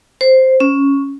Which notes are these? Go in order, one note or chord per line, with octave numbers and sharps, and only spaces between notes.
C5
C#4